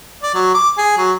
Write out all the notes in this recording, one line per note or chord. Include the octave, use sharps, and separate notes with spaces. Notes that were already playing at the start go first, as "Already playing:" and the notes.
D5
F#3
D6
G#4
F#3